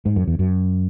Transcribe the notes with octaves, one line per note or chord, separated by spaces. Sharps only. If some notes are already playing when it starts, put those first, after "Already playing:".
G#2
F#2
E2
F#2